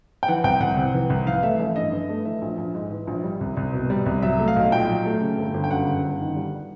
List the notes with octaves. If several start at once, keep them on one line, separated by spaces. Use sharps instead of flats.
G5
E3 F#5
C2 G5
C2 F#5
C3
E3
C2
E3 F5
A3 E5
A1 E5
G2 D#5
E3
A3
E3 E5
A#1
A#1
G#2
E3
A#1
G3
C2
C2
B2
G3
C2
F#3 E5
A3
F5
B1
A#2 G5
F#3
A3
C#3
G1
G1
G5
F#2 F#5
C#3
G1
D#3
G3